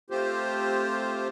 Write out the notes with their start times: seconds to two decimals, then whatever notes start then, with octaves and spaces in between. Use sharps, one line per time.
0.10 A3 C4 F4 G4 C5